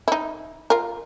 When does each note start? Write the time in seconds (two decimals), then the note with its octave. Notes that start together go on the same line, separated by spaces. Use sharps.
0.08 D#4 E4
0.70 F4 A#4